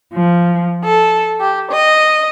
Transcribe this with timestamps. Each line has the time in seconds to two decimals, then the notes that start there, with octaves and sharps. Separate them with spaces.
0.13 F3
0.83 A4
1.40 G4
1.70 D#5